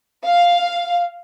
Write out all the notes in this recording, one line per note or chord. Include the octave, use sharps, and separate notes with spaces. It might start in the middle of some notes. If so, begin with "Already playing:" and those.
F5